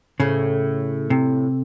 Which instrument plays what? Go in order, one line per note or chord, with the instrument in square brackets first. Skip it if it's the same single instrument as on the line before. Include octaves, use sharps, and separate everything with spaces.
[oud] A2 [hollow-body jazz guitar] C#3
[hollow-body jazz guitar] C3